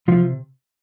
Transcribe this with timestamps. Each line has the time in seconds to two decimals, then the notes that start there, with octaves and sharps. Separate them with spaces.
0.08 C3 F3 F4